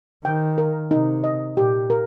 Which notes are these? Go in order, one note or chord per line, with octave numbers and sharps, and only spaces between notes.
D#3 G5
A#4
C3 D#4
D#5
A#2 G4
A#4